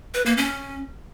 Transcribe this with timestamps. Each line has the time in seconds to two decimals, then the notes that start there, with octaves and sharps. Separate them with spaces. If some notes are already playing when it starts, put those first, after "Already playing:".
0.14 B4
0.26 A#3
0.37 C#4